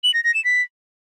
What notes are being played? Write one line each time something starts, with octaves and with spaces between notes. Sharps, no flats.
F#7
A#6
A#6
E7
B6